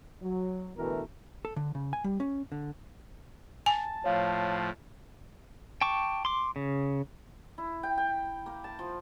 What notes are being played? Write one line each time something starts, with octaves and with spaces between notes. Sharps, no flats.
F#3
D2 B2 E3 A3 B3 A#4
A4
D3
C#3
G#5
G3
C#4
D3
G#5 A5
A2 F3 C#5 F5
G5 A5 C#6 D6
C6 D6
C#3
E4
G5
G5
A#3
A5
F3